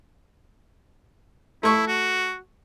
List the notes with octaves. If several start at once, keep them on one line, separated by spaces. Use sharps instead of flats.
A3 E4 C#6
F#4